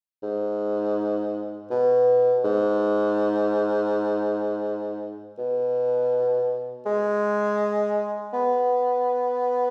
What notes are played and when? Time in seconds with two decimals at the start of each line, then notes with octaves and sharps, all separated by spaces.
0.23 G#2
1.70 B2
2.44 G#2
5.38 B2
6.86 G#3
8.33 B3